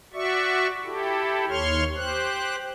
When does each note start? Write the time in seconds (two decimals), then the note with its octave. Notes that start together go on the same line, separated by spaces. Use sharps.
0.13 F#4 D5 E5 C#6
0.84 E4 G4 A4
1.49 D#2 C#5 C6 C#6 F6
1.95 G4 C5 F#6